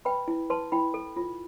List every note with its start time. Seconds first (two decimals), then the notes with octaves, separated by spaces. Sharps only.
0.05 B4 G5 B5
0.28 E4
0.50 B4 A5 C6
0.72 E4 G5 B5
0.94 A4
1.16 F4